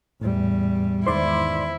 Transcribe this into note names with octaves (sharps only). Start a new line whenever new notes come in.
E2 A2 G3
E2 G#2 D#3 E4 C5 D5 C6